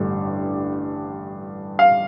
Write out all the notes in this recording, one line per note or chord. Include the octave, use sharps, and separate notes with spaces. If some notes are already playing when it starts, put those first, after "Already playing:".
Already playing: A1 G2 D3 A3
F5